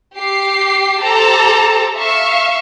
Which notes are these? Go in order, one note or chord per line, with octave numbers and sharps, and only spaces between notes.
G4 C7
G4 A4 C5 A5 A#5
E5 F5 C#6